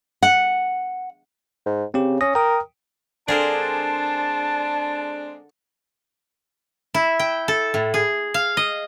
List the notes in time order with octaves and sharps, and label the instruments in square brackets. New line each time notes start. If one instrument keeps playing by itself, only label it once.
[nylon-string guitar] F#5
[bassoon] G#2
[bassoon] C#3 [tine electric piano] C4 G4
[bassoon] C#4 [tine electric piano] D#6 A#6
[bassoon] A#4 [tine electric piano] G5 D#6
[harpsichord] D3 [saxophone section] G#3 C4 D4 [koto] G#4 A#4 C5 [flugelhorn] A5
[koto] E4
G5
A4
A2
G#4
F5
D#5